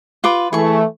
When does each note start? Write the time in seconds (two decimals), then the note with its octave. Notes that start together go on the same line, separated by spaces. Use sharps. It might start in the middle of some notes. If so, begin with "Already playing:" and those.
0.24 F4 B4 D6
0.53 E3 A3 G#4 C#6